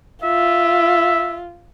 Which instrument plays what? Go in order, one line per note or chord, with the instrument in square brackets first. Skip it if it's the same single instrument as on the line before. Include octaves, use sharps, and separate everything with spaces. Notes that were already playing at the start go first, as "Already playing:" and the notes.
[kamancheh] F4 [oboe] E5